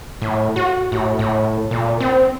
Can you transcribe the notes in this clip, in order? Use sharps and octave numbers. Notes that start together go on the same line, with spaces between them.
A2
F#4
A2
A2
A#2
C4